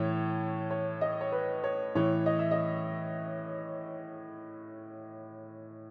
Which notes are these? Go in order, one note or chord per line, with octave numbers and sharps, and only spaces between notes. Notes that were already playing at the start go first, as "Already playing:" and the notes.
Already playing: A2 E3 C#5
C#5
D#5
C#5
B4
C#5
A2 E3 C#5
D#5
E5
D#5